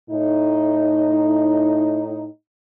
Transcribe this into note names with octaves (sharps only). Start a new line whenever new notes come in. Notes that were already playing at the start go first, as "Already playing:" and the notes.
A2 D#4